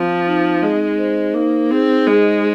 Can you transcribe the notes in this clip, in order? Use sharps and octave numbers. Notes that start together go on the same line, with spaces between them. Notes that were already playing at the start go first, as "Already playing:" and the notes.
Already playing: F3 C4
D#4
G#3 D#5
C5
A#3 D#4
C4 G#4
G#3 D#5